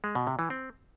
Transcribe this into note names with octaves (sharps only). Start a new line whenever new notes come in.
G#3
B2
C3
E3
C4